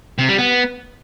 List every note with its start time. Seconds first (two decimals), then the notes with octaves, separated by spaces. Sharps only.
0.18 C3
0.28 G3
0.38 B3